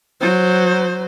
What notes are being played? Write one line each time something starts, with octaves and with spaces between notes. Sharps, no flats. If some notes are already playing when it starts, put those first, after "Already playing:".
F#3 C5